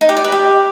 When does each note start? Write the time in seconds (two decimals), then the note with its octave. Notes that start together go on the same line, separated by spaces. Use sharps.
0.01 D#4
0.09 G4
0.17 D5
0.24 B4
0.32 G4